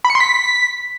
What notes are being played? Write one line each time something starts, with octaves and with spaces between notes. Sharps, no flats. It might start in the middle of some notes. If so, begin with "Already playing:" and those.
B5
C#7
C6
B6